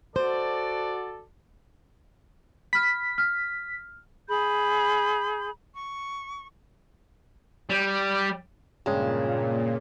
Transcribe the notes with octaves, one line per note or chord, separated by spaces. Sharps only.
F#4 A4 C5 D5
B5 F6 B6
F6
G#4 B5 G6
C#6
G3
G2 A#2 C#3 G#3